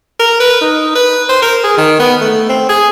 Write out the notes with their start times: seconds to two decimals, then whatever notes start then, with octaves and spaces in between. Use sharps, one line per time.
0.20 A#4
0.40 B4
0.61 D#4
0.95 B4
1.29 C5
1.42 A#4
1.64 G#4
1.78 D#3
2.00 B3
2.21 A3
2.49 C4
2.69 G#4